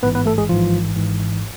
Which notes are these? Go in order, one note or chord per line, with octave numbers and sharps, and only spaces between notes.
A1 G#2 E3 B3 B4
B3 B4
A3 A4
G#3 G#4
A1 G#2 E3 F3 F4
G#1 G#2 E3